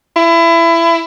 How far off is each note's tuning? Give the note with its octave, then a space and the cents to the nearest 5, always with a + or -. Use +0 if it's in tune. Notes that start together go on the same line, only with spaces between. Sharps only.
E4 +25